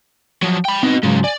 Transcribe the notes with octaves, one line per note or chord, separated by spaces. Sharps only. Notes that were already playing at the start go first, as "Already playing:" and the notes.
F3 F#3
G5 B5
B3 C4 D#4 F#4 D#5
G#2 C#3 F#3 G#3 F4
D5 G#5